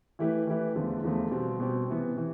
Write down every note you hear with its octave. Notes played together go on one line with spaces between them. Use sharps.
E3 A3 E4 G4 B4
E3 A3 E4 G4 B4
E2 D3 F3 A3
E2 D3 F3 A3
B2 G3 C4 G4
B2 G3 C4 G4
C3 E3 B3
C3 E3